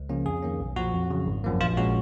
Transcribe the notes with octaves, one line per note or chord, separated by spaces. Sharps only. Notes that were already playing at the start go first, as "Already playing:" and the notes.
Already playing: C#2
C#3 F3 A#3 C#4
F2 G#4
D#3 A#3 C#4
B1
A#2 F3 F#4
F2
C#3 F#3
G#1
F#2 F3 A#3
A#1 F4
A#2 G#3 C#4 F#4